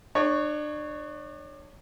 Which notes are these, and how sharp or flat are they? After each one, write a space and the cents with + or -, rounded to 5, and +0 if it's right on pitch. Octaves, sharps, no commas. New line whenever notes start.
D4 +35 C#5 +0